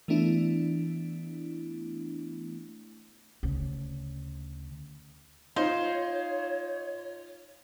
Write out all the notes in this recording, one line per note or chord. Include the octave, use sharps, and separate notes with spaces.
E3 A3 B3 D4 E4
D2 C#3
D#4 F4 C5 C#5